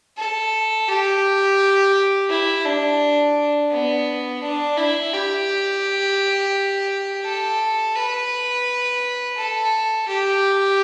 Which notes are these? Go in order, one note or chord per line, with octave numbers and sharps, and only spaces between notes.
A4
G4
E4
D4
B3
D4
E4
G4
A4
B4
A4
G4